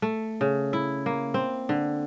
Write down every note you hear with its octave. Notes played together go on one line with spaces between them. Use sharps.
A3
C#3
E4
A#3
C4
D3